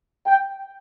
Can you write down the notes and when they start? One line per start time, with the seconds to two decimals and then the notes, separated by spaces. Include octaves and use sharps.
0.26 G5